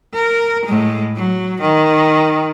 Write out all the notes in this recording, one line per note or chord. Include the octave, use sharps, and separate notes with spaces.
A#4
A2 G#3
F#3
D#3